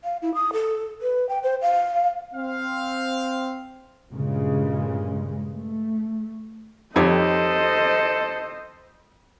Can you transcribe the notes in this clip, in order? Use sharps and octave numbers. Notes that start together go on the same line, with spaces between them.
F5
E4
D#6
A4
B4
G5
C5
F5
C4 F5
G2 A#2 C#3 G#3
A3
F2 D#4 G4 A4 C5 C#5 D#5